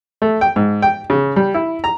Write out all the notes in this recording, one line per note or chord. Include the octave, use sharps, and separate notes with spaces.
A3
G5
G#2
G5
C#3
G3
E4
A#5